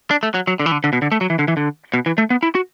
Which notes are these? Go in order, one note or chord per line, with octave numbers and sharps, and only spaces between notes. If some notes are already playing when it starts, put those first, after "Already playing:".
D4
A3
F#3
F#3
D3
E3
D3
D3
B2
D3
A3
F#3
E3
D3
E3
D3
B2
E3
A3
B3
E4
F#4